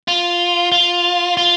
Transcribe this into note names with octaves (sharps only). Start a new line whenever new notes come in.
F4
F4
F4